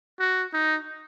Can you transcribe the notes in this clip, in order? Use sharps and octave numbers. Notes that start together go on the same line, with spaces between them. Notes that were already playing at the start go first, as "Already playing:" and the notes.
F#4
D#4